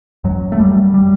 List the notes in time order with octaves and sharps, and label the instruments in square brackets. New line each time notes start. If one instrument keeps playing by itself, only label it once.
[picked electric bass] F#2 F#3
A3
F#2 G3
G3